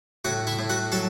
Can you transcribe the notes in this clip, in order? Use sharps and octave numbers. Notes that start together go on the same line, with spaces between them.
A2 F#4 F#5
E4 E5
A2
F#4 F#5
F#3 A4 A5